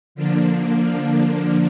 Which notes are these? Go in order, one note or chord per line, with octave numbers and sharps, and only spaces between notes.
D3 F3 A#3 D4